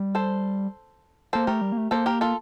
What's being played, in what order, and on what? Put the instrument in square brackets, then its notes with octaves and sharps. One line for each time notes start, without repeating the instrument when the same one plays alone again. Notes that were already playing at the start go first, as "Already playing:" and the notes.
Already playing: [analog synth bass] G3
[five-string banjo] A4 C5
[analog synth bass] A#3 [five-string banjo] A4 C5
[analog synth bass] A3 [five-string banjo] G4 A#4
[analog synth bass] G3
A#3
A3
[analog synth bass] A#3 [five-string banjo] A4 C5
[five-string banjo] G4 A#4
F4 A4